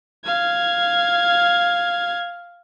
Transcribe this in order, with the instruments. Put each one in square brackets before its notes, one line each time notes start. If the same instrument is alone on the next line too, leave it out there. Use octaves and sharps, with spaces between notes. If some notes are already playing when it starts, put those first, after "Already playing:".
[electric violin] F5 G#6